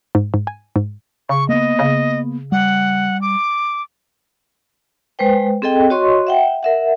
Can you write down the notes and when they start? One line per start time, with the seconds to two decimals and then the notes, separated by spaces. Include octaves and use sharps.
0.15 G#2
0.34 G#2
0.47 G#5
0.76 G#2
1.29 C#3 C#6
1.49 A#3 B3 D#5
1.79 C#3
2.52 G3 F#5
3.22 D6
5.19 G#3 B4 C5 G5
5.62 C4 G#4 A4 D#5 G5
5.90 F#4 C#5 D#5 C6 C#6
6.27 E5 F#5 G5
6.63 A#4 E5 F#5